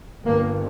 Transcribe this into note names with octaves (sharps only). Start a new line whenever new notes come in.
G1 G2 A#3